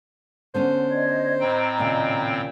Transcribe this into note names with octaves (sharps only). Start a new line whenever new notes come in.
D3 B3 C#4 C5
D5 D#5 G#6
A2 C4 D#5 G5 A#5
D#2 A#2 C#3